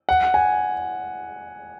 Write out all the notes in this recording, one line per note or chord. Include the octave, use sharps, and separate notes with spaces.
F#5
G#5